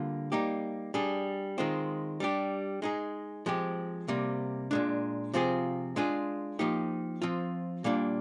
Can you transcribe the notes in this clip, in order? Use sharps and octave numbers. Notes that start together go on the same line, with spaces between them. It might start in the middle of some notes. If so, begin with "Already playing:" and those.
Already playing: D3 G3 A#3 F4
G3 A#3 D#4 G4
G3 D4 G#4
D#3 G#3 C4 F4
G3 D4 G4
G#3 D#4 G#4
F3 G#3 C4 G4
C3 G3 A#3
A#2 G#3 D4
C3 F3 C4 F4 G#4
G#3 D4 F4 G#4
F3 A#3 D#4 G4
F3 C4 F4
A#2 G3 A#3 D4